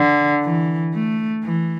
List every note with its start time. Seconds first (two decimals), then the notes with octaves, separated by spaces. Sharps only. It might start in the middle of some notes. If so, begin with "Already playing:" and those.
Already playing: D3
0.44 E3
0.94 A3
1.44 E3